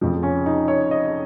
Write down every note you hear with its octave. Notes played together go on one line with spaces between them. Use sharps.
F1 F2 C#3 F3
C#4
D#4
C#5
D#5